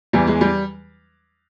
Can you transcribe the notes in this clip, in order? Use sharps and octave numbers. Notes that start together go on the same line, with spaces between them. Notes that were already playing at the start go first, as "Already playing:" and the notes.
E2 E3 G3
G#3
G3